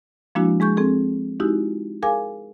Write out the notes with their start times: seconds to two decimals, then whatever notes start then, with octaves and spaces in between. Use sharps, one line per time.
0.35 F3 G#3 A#3 D4 E4 F#4
0.60 G#3 G#4 C#6 G6
0.77 C4 G#4 A4
1.40 G#3 D#4 E4 F#4 G4
2.03 G#4 A#4 F5 G#5 D6